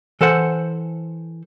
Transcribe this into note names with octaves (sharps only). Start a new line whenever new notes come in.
E3 A4 C5 F#5